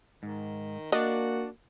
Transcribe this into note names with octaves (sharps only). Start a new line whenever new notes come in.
G#2 D#3
A#3 D4 F#4 D5 D#5